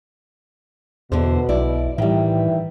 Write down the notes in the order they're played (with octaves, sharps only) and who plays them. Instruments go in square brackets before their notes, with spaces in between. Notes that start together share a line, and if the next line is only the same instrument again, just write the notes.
[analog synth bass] E2 [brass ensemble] B2 [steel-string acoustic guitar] D3 E3 C5
[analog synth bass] B1 [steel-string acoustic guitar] E4 D5
[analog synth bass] A2 [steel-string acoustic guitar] D#3 G3 [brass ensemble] E3 E5